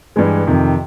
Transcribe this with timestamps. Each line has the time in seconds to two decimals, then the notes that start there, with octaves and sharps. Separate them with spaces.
0.16 G2 E3 G#3
0.47 F2 C3 D#3